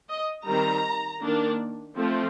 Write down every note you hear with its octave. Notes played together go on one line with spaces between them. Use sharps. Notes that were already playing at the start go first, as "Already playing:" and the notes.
D#5
D#3 G3 C4 A#5
D#3 A#3 D4
F3 A3 C4